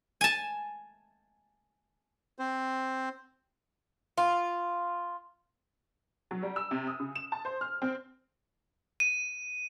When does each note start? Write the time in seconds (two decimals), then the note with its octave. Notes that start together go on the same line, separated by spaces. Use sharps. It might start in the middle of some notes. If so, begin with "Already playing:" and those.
0.21 G#5 A5
2.39 C4 C5
4.18 F4
6.31 F#3
6.43 G3
6.56 E6
6.71 C3
6.87 D#6
7.00 C#3
7.15 E7
7.32 A5
7.45 C5
7.61 F6
7.82 C4
9.00 D#7